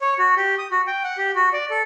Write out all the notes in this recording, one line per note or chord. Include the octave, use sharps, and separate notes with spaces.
C#5
F#4
G4
D#6
F#4
G5
F#5
G4
F#4
D5
A4